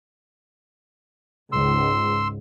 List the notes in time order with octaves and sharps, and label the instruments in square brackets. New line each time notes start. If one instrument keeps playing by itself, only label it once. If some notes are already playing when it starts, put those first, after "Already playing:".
[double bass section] C#2 G#2 [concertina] C6 E6